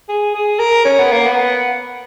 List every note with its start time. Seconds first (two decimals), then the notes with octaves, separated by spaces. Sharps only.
0.09 G#4
0.34 G#4
0.59 A#4
0.85 C#4
0.98 B3
1.12 A#3
1.26 B3